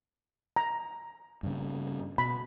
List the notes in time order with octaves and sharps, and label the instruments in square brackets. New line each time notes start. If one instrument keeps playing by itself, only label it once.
[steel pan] A#5
[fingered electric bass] G2 C#3
[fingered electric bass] B2 [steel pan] B5